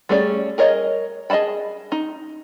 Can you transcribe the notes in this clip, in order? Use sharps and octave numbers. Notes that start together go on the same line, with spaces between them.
G3 A3 C#4 G#4 D5
G#4 A#4 C#5 D#5
G#4 D#5 F5 A5 B5
D#4